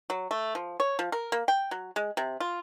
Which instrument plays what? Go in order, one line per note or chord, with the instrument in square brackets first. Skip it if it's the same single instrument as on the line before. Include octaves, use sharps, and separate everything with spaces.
[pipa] F#3
A3
F3
C#5
F3
A#4
A#3
G5
F#3
G#3
C3
F4